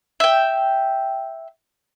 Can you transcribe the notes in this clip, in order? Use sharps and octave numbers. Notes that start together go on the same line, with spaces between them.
E5 G5